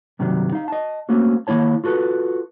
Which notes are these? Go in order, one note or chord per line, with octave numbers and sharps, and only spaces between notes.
G2 C3 D#3 F#3 G3
D#4 F5
D#5 A5
A3 A#3 C4 C#4 F#4
D#3 A#3 E4 C#5 A5
F4 F#4 A4 B4